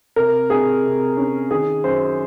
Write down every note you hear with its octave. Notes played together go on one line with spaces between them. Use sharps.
C3 A#4
C3 G#4
C3
C#4
D#3 G#4
F#2 C5